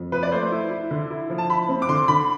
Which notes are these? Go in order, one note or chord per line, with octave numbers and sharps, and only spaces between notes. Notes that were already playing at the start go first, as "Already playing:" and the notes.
Already playing: F2
F3 B4
D5
A3 C5
E4
E4
D3
E4
F3
A5
E4 B5
C4
D6
D3 C6
D3 B5